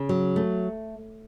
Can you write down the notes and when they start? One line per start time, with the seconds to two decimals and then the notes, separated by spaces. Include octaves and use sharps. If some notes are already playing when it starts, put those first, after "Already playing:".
Already playing: C#3
0.09 F#3
0.36 A3